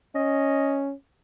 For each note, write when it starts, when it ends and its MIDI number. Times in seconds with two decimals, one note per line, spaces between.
0.15 0.92 61
0.15 0.81 75